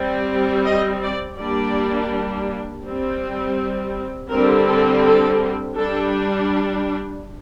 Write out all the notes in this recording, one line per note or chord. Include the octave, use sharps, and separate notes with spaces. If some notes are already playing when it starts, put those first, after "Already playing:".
Already playing: G3 C4
D#5
D5
G3 A#3 D4 D5
G3 C4
D3 G3 C4 A#4
A4
A4
G3 D4 A4